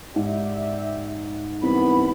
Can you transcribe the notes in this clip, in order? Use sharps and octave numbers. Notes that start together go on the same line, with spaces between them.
G#2 G4 D5 E5
C2 E3 B3 B5